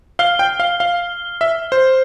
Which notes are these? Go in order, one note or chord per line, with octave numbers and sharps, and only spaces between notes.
F5 F6 C7 G7
G5
F5
F5
E5
C5